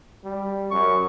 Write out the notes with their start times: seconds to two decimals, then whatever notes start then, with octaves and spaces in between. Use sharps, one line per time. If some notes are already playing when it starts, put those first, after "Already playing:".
0.24 G3
0.71 F#2 C#6